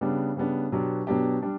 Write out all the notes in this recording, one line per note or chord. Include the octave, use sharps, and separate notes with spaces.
C#3 G3 B3 D4
C#3 G3 B3 D4
B2 F#3 B3 D4 G4
B2 F#3 B3 D4 G4
G3 D4